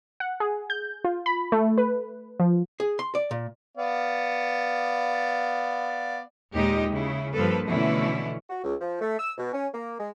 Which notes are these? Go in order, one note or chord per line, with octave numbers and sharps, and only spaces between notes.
F#5
G#4
G6
F4
B5
A3
B4
F3
G#4
C6
D5
A#2
B3 D5 F5
D#2 A#2 G#3 D#4 G4 D#5
C#3 E4
G2 F3 A#3 A4 B4
B2 D3 E3 A3 C#4 E4
F#4
C#2
F3
A3
E6
B2
C#4
A#3
G#3